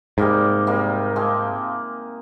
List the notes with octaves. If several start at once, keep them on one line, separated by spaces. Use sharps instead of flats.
G#2 C3 G3 A#3 D#4
C3 G3 A#3 D#4
F3 G#3 C4